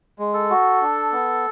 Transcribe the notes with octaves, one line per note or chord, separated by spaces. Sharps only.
G#3
A4
F#4
D4
B3